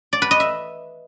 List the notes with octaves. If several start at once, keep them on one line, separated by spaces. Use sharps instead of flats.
D5
B4
D#5
E5